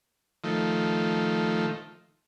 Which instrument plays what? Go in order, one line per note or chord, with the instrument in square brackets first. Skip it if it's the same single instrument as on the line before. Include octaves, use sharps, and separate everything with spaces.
[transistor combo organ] D#3 F3 A3